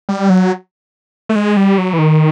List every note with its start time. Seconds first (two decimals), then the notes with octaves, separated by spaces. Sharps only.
0.09 G3
0.30 F#3
1.29 A3
1.35 G#3
1.57 G3
1.78 F#3
1.93 E3
1.99 D#3